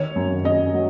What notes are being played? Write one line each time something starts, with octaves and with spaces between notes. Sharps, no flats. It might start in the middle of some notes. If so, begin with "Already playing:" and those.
Already playing: D#3 C#5
F#2
C#4 D#5
F#3